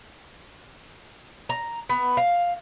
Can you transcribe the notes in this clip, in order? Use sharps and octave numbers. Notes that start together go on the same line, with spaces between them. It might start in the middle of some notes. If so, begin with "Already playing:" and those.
A#5
B3
F5